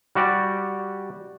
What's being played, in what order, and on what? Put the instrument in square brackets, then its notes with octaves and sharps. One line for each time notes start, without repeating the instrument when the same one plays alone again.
[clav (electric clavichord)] G3 F#4 G4 D5